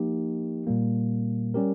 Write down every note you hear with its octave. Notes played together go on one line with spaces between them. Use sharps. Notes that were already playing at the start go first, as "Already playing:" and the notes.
Already playing: F3 A#3 D#4 G4
A#2 G3 A#3
G3 C#4 G4 A#4